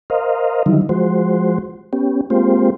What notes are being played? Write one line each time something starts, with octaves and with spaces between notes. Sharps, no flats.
A#4 C5 D#5 F5
D3 D#3 F#3 G3 D#4 E4
F3 G#3 F#4 C5
B3 C#4 G4
G#3 A#3 C4 F4 G4 C5